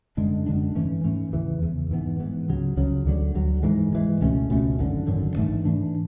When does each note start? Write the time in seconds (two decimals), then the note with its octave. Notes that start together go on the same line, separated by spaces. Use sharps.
0.17 F#2 D3 G#3 D4
0.46 F#2 D3 G#3 D4
0.75 G#2 E3 A3 C#4
1.04 G#2 E3 A3 C#4
1.33 E2 C#3 E3
1.62 E2 C#3 E3
1.91 G#2 E3 B3
2.20 G#2 E3 B3
2.48 C#2 C#3 F#3
2.77 C#2 C#3 F#3
3.05 D2 D3 F#3
3.35 D2 D3 F#3
3.63 G#2 E3 G#3
3.92 G#2 E3 G#3
4.21 C#2 B2 A3 C#4
4.50 C#2 B2 A3 C#4
4.79 G#1 F#2 D3
5.07 G#1 F#2 D3
5.36 G#2 E3 A3 D4
5.65 G#2 E3 A3 D4